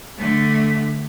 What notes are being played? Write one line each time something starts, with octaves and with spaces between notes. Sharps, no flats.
D3 A3